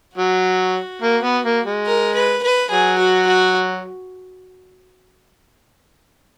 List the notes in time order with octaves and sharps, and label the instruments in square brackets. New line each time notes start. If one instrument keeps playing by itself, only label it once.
[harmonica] F#3 [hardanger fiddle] F#4
[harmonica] A#3
B3
A#3
G#3
[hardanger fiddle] A#4
B4
B4
[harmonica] F#3 [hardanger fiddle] G#4
[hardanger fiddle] F#4
F#4